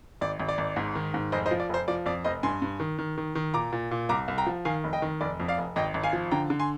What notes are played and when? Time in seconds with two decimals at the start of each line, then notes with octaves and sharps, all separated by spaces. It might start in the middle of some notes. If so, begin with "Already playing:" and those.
0.21 G#1 D5
0.40 G#1
0.49 D5
0.58 G#1
0.76 G#2
0.95 D#3
1.14 G#2
1.32 F1 C5 D#5
1.46 C5 D#5
1.51 F3
1.60 D5
1.69 F1 C5
1.88 F3 D5
2.06 F2 D5
2.24 F1 C5 D#5
2.43 G2 G#5 C6
2.62 G2
2.80 D#3
2.99 D#3
3.18 D#3
3.35 D#3
3.54 A#2 A#5 D6
3.73 A#2
3.91 A#2
4.09 C2 A#5 D6
4.28 C2
4.38 G5 A#5
4.46 F3
4.65 D#3 F5 G#5
4.84 F1
4.93 D#5 G5
5.02 D#3
5.21 F1 D5
5.40 F2
5.48 D5 F5
5.58 F1
5.76 G#1 D#5 G5
5.94 G#1
6.04 F5 G#5
6.13 F3
6.31 D3 G5 A#5
6.50 D3
6.60 G#5 C6